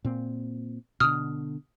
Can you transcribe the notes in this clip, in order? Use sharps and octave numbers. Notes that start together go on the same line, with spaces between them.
A#2 C4
B2 D3 D#6 F6